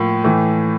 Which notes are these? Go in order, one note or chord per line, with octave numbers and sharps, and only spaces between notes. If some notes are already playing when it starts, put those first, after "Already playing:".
Already playing: A2 F3 A#3
A2 E3 A3